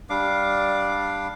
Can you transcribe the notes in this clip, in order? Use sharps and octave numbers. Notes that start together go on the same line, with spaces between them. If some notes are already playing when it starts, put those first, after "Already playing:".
G3 D4 F5 D6